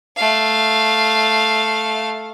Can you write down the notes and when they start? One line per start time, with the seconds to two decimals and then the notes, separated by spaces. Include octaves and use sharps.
0.17 A3 F5